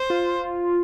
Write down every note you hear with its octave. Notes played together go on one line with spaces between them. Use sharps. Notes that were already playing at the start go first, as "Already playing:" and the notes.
Already playing: C5
F4